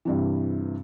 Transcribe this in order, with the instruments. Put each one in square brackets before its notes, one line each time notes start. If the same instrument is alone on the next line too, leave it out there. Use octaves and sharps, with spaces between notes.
[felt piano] G2 C3 E3